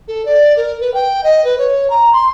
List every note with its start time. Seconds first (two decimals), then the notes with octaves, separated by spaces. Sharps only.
0.08 A4
0.25 D5
0.57 A#4
0.81 B4
0.94 G5
1.24 D#5
1.44 B4
1.58 C#5
1.90 A#5
2.13 C6